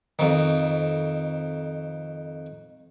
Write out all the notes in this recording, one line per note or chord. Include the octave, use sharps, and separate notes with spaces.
F2 D#3